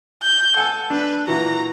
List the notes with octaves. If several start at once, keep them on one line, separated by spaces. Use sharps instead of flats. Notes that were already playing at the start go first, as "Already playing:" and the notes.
G6
A4 F#5 G#5 E6
D4 B4
A#2 E3 F#4 A#5